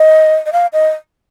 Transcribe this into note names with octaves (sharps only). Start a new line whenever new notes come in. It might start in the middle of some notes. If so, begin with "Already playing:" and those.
Already playing: D#5
D#5
F5
D#5